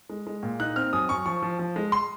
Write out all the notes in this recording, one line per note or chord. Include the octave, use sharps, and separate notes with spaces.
G#3
G#3
A#2
D#4 F#6
C4 F6
F#2 D#6
F#2 C#6
F3 C#6
F3
F3
G#3
C6